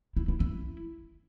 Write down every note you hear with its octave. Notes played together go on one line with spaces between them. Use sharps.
E4
E4
E4